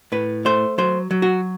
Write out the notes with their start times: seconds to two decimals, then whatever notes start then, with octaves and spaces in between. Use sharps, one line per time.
0.12 A2 B4
0.45 A3 C5
0.78 F#3 C5
1.11 F#3
1.22 F#4